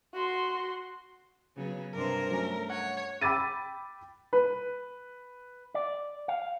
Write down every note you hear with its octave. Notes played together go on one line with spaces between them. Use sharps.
F#4 C6
C#3 F#3 B3
G2 C3 A#4 C5
F#3 A3 C#4
C#5 F#5
G5 B5 D6 E6 A6 D#7
B4
D5
F5